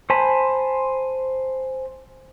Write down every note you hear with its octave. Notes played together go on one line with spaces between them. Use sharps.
C5 G#5 A5 B5